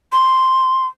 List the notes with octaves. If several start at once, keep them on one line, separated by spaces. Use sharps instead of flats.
C6